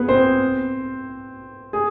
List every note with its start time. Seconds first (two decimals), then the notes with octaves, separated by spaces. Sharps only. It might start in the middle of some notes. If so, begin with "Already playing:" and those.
Already playing: B3 G#4 B4
0.08 C4 C5
1.73 G#4